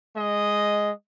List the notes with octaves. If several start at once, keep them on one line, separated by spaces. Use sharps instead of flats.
G#3 D#5